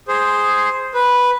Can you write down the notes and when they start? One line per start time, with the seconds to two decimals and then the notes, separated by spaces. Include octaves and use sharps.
0.08 G#4 C5
0.94 B4